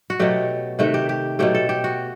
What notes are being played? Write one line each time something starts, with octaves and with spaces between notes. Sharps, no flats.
F#4
B2 F#3 A3 G4
C3 D#3 A3 F#4
G4
G4
B2 F#3 A3 G4
A4
G4
F#4